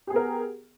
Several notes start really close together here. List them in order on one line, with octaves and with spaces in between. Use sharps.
G4 G#4 B3 A#4